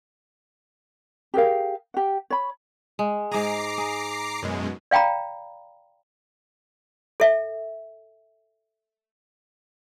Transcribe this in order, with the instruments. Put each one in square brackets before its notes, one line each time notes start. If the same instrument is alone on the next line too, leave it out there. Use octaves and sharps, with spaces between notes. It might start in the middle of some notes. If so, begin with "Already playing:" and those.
[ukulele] G4 G#4 A#4 F5
G4 F#5
C#5 B5
[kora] G#3
[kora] G#2 G#4 [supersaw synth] A#5 D6 C7
[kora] G#4
[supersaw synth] F#2 B2 G#3
[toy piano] D5 F5 G5 A#5 B5
A4 E5